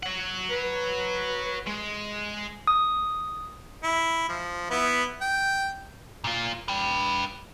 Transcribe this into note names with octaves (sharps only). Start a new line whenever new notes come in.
C#5 F#5
B4
G#3
D#6
E4
F3
B3 E4
G5
A#2 F4
B4 G5